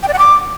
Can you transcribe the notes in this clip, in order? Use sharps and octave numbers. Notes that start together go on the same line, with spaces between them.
G5
D5
F#5
D6